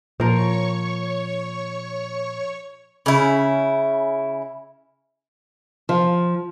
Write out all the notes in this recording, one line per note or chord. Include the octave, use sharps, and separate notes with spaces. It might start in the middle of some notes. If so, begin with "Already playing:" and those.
A#2 F3 A#4 C#5 C#6
C#3 E4
F3